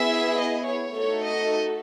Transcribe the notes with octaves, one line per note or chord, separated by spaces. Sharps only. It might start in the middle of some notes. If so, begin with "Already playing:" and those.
Already playing: B3 E4 G#4 E5
D#5
C#5
A3 D#4 F#4 A4 C#5
D#5